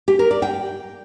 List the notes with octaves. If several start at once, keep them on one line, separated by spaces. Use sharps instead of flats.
G4
A#4
D5
G5